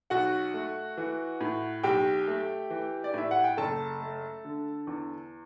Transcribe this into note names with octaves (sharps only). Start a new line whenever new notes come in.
B1 F#4 F#5
A3
E3
A2
B1 G4 G5
A3
E3
D5
A2 E5
F#5
G5
F#1 A4 A5
A3
D3
E2